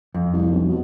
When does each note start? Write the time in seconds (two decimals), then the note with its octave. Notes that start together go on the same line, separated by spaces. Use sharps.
0.14 F2
0.33 C2
0.51 B1
0.68 B2